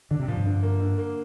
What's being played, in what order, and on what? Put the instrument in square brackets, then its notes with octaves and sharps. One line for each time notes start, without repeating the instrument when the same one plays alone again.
[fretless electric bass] D3 [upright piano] D4
[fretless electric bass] C3
[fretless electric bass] A#2 [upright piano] F3
[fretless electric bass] G2
[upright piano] D3
A#3
D3
A#3